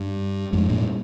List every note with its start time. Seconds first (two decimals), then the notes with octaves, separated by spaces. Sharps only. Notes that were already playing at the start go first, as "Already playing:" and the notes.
Already playing: G2
0.53 F2 G#2
0.69 G2 A#2